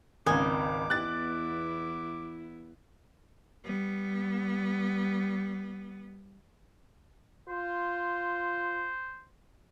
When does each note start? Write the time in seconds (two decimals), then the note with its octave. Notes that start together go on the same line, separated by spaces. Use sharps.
0.26 G#1 C#2 C4 D#5 G#5 D6
0.90 E2 B3 E4 F#6 A6
3.65 G3 B3
7.48 F4 C5